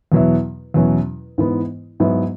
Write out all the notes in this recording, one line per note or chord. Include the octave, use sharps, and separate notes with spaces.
E2 B2 F#3 B3 E4
E2 B2 F#3 C#4 E4
G#2 E3 B3
G#2 F#3 B3 E4